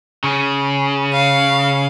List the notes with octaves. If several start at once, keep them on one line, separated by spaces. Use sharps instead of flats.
C#3
F5